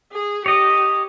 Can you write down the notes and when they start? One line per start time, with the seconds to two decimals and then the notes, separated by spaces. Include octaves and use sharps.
0.12 G#4
0.46 G4 C#5 D#5